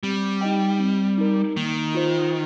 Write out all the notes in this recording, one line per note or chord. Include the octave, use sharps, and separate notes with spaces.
G3 C4
D#4 G4 D#5 G5
C4
D#4 A#4
D#3 A#3
F4 C5